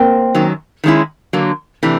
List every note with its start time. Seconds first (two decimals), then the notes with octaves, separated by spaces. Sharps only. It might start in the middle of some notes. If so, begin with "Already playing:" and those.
Already playing: A#3 C4
0.35 F#2 D#3 F#3
0.84 D#3 G#3 C#4 E4
1.33 D3 F#3 A#3
1.83 C3 E3 A3 D4